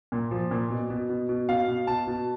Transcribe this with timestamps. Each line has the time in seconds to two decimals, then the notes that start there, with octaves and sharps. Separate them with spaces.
0.12 A#2
0.31 F3
0.51 A#2
0.70 B2
0.90 B2
1.09 B2
1.29 B2
1.49 B2 F5
1.68 B2
1.87 B2 A5
2.07 B2